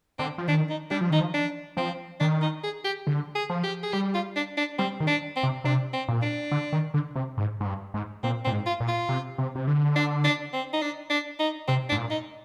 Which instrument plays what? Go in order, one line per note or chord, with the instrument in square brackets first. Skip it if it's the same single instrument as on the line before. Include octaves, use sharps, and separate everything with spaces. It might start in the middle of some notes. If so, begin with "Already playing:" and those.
[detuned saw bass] D3 [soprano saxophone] C4
[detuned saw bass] F3
[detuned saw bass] D#3 [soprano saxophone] D4
[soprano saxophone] D#4
[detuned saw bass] G3 [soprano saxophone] D4
[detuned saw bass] F3
[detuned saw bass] D#3 [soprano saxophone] D#4
[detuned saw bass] F3
[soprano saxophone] D4
[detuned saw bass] F3 [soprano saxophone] C4
[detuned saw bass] D#3 [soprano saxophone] D4
[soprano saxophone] D#4
G#4
G4
[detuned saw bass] D3
[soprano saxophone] G#4
[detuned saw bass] F3
[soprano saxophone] G4
G#4
[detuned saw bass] G3 [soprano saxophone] G4
[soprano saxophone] F4
D4
D4
[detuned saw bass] G3 [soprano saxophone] C4
[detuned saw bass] D#3
[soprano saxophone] D4
C4
[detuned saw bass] C3
[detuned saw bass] C3 [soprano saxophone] D4
[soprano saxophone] C4
[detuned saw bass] A#2
[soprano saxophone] D4
[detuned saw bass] D3
D#3
D3
C3
G#2
G#2
G2
G#2
[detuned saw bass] A#2 [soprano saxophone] C4
[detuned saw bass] A#2 [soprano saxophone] C4
[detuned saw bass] G#2
[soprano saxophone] F4
[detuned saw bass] A#2
[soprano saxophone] F4
[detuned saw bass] C3
C3
C3
D3
[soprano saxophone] D4
D4
C4
D#4
D4
D4
D#4
[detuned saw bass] C3 [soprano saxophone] C4
[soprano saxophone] D4
[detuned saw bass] G#2
A#2
[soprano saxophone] D#4